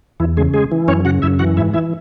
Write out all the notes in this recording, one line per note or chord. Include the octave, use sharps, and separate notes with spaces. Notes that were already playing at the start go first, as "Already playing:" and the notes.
E2 E3 E4
C#3 G#3 G#4
G#3 G#4
E3
F#2 C#4 C#5
C#3 F#4 F#5
F#2 E4 E5
E3 F#4 F#5
G#2 E4 E5
E3 E4 E5